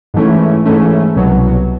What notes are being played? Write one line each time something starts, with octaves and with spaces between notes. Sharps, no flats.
G#2 E3 A3 C#4
G#2 E3 A3 C#4
C2 B2 F#3